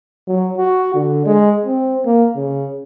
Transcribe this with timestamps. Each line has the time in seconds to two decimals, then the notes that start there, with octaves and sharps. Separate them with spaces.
0.28 F#3
0.57 F#4
0.95 D3
1.26 G#3
1.65 C4
2.06 A#3
2.36 C#3